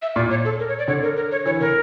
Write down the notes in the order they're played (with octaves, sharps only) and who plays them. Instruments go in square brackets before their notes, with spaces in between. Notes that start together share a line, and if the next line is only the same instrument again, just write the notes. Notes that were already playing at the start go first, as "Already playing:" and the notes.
[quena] E5
[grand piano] A#2 [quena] D5
[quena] C#5
A4
A#4
C#5
D5
[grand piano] D3 [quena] C#5
[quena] A#4
A#4
C#5
[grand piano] E3 [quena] C#5
[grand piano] D3 [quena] A#4